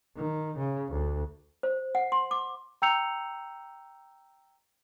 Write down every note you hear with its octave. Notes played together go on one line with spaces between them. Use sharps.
D#3
C#3
D2
C5
F#5
C6
D6
G5 A#5 E6 G6 C#7 F7